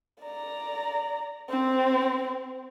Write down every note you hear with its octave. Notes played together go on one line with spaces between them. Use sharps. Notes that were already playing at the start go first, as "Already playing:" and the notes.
D5 A#5
C4